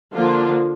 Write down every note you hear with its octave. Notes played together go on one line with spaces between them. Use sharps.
D3 F3 A#3 D4 F4